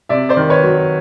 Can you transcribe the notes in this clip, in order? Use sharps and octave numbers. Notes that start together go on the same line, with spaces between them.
C3 D5 E5
C5 D5
D#3
B4 C#5
F#3